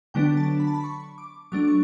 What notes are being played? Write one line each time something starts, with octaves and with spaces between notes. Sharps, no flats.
D3 F#3 B3 D4 G5
A5
B5
A5
B5
C#6
D6
F#3 A3 D4 D6
C#6